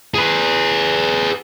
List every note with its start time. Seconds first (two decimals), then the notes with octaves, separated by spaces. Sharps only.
0.14 G#4 B4